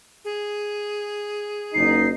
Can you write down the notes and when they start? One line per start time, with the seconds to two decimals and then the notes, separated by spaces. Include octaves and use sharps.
0.25 G#4
1.74 F#1 D#4 C7